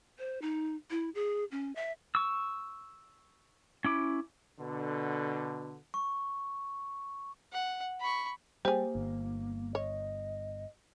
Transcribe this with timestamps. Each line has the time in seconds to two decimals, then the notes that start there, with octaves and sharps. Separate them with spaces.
0.18 C5
0.42 D#4
0.91 E4
1.15 G#4
1.51 C#4
1.76 E5
2.15 C#6 E6
3.84 C#4 E4 D6
4.59 B2 D3
5.94 C#6
7.53 F#5
8.00 B5 C#6
8.65 G3 A#3 G4 G#4 C5
8.95 G1
9.75 C#5 D#5